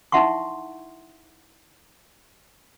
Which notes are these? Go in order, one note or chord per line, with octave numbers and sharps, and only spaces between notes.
D#4 E4 E5 F#5 C6 C#6